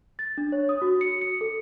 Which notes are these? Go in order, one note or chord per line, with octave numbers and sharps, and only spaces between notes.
A6
D4
C#5
D#6
F#4
C#7
C#7
A4